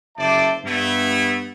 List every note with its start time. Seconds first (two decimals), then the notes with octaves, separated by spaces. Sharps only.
0.17 F#1 C5 D5 E5 A5
0.64 G2 A3 B3 E4